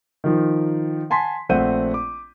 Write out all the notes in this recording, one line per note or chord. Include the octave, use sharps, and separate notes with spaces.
D#3 F3 D#4
F#5 G#5 A5 C6 B6
A#1 A3 C4 F#5 G6 D#7
D6